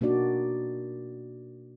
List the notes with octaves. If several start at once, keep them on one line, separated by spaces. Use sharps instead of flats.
B2 A#3 D4 D#4 F#4 D5